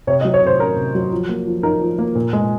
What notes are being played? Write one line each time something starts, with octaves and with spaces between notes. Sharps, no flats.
C3 C#5
D#5
F#3
C#5
C3 C5
C#4 A#4
C3
F#3
F3
A#3
F3
D#4 A#4
F3
A#3
A#2
G#3